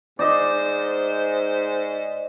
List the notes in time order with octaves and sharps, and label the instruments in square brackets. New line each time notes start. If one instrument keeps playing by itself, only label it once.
[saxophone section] G#2 C5 [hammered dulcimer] D5 D#5